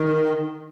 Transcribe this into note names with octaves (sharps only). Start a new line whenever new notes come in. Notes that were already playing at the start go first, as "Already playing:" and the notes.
Already playing: D#3